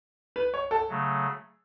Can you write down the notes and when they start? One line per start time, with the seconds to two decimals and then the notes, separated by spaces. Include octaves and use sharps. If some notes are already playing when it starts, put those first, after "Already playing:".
0.36 B4
0.54 C#5
0.71 A4
0.89 C#3 F#3 A3